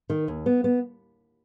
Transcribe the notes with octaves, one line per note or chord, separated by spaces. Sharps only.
D#3
D#2
B3
B3